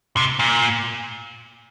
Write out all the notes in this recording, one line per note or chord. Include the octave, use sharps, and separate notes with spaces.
C3
A#2